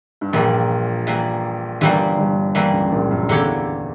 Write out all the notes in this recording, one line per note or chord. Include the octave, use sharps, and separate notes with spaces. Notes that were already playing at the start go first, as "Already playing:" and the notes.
G2
A#1 A#2 E3 G3 A#3
E3 G3 A#3
G1 G2 E3 G3 A#3
G1 G2
E3 G3 A#3
C#2 C#3
A#1 A#2
F#2
E2 D3 A#3 E4 G4 C#5